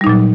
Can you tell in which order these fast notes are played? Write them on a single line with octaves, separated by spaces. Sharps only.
G3 D#4 A#2 F#3